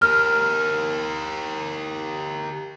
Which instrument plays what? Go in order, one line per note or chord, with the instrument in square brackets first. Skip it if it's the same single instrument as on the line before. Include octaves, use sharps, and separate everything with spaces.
[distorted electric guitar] G4 A#4 [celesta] F6